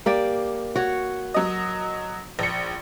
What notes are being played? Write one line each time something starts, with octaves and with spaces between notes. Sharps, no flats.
A#3 G4 D5
F#4 C#5
F#3 D#5
A#1 C#7